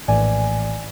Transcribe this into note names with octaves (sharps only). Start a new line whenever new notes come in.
A#1 A2 E3 D5 G#5